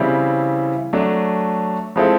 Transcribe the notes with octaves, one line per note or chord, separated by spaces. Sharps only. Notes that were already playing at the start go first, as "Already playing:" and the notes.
Already playing: C#3 E3 G3 C4 E4
F#3 A3 D4
F3 G#3 C4 E4 A4